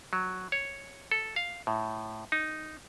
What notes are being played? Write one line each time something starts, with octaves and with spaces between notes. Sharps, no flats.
F#3
C#5
A4
F5
A2
D#4